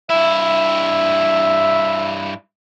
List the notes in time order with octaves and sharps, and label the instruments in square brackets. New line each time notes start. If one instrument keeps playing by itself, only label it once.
[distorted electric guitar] G2 E4 [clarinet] E5